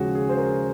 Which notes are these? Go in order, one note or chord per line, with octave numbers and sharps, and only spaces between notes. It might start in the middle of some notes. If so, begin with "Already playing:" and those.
Already playing: D#2 C#3 F3 G#3 F#4 G#4
G#4
C5
A#4